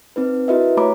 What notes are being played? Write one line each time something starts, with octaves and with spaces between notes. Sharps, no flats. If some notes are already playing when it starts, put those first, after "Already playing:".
C4 D#4 B4
E4 F#4 A#4 B4 D#5 E5
A3 G4 C#5 A#5 B5 D6